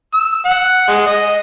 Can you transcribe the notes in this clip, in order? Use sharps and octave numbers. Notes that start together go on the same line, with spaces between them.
E6
F#5
G#3
D#5